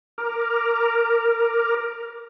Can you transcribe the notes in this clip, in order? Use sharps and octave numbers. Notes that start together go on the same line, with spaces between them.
A#4 A#5 D6 F6